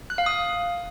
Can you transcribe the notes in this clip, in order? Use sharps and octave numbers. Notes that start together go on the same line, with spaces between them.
F#6
F5
D#6